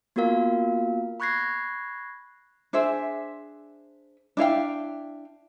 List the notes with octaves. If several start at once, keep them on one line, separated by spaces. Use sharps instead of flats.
A#3 B3 F4 F#4 A#4 F5
B5 C#6 F#6 G#6 A#6 C7
D4 G#4 C5 E5
D4 E4 F5 G5